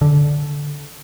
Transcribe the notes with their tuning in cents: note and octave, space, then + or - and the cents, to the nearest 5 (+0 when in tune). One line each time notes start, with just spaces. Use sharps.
D3 -10